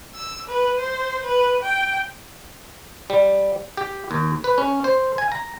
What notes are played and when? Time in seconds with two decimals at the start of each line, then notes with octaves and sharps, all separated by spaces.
0.15 E6
0.48 B4
0.79 C5
1.25 B4
1.62 G5
3.10 G3
3.77 G4
4.11 D#2
4.44 B4
4.58 C#4
4.84 C5
5.18 G#5
5.32 A#5